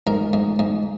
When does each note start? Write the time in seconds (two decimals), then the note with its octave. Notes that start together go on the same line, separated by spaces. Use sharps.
0.07 G#2 A#4
0.33 G#2
0.59 G#2